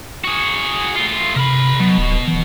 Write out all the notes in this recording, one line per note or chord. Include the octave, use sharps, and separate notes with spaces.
F#4 G#4
A3 F4
C3 A#4 B5
B2 F#3
D1
E3